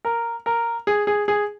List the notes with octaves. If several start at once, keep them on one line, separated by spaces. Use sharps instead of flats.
A#4
A#4
G#4
G#4
G#4